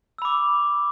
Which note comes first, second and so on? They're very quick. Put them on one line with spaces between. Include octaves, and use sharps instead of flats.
E6 B5 D6